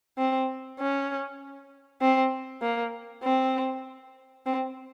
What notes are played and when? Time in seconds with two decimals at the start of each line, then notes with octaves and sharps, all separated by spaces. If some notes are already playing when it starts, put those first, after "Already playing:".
0.18 C4
0.79 C#4
2.01 C4
2.62 A#3
3.23 C4
4.46 C4